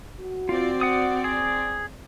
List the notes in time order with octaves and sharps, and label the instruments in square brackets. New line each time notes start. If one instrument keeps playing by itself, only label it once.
[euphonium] F#4
[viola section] C4 D5 [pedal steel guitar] F4
[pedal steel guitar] F#5 D#6
G#4